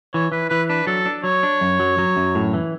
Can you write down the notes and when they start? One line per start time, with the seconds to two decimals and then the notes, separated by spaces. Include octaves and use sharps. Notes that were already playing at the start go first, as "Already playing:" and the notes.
0.14 E3 C#5
0.32 E3 B4
0.50 E3 B4
0.69 D4 B4
0.87 F#3 A4
1.06 D4
1.24 F#3 C#5
1.43 D4
1.61 F#2
1.80 F#3
1.98 F#3
2.17 F#2
2.35 A2
2.54 E3